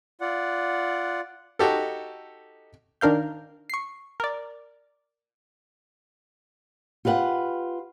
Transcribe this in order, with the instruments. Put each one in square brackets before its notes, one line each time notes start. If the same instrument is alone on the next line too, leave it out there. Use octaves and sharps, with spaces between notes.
[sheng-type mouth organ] F4 D5 F#5
[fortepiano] D#4 F#4 G4 A4
[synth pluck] D#3 D4 A#4 F5 G6
C#6 C7
A#4 D5
[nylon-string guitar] F4 G4 B4 F5 F#5